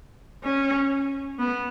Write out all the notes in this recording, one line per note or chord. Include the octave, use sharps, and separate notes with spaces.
C#4
B3